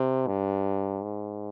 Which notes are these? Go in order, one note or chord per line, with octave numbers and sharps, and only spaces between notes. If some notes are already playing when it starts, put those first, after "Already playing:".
Already playing: C3
G2
G#2